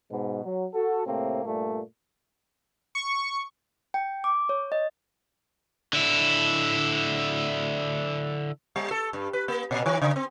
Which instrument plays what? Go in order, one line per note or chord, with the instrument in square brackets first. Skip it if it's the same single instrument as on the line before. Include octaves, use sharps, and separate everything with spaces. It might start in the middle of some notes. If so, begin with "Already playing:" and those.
[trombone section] G#2 B2
F#3
F#4 A4
A2 C3 A3 A#3 C4
G2 A#2 A3
[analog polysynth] C#6
[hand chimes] G5
D6
C#5
D#5
[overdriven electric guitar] D3 E4
[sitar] G3
A4
G2
B4
A#3
A#2
D#3
C#3
C4